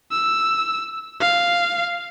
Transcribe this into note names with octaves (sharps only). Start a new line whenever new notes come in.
E6
F5